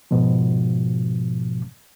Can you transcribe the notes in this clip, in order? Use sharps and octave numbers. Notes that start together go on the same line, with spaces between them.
G#2 B2 F3